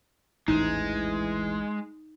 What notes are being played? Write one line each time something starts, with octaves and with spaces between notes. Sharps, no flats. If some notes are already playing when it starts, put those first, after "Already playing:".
A1 D#2 G#2 E3 G#3 D#4